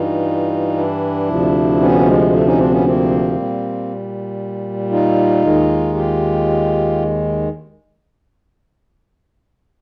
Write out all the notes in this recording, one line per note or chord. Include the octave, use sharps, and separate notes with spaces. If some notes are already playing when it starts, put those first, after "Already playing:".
Already playing: G2 E3 G3 D#4 F4
D4 E4
D2 C3 F3
B3 C#4
G#3
A3
C#4 D#4
C4 D4
B3 C#4
A#3 C4
A#2 G3
D#4 F4
D#2 D#3 G#3
F4 G4